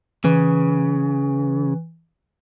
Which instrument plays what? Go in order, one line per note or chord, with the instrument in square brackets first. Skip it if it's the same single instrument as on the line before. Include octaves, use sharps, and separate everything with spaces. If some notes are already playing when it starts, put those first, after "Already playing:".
[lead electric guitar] C#3 [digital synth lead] E3